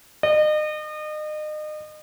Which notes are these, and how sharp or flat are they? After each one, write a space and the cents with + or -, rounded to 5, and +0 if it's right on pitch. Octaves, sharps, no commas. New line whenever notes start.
D#5 -35